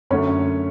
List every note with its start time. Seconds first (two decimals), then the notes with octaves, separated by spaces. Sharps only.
0.10 F#2 D3 A3 C#4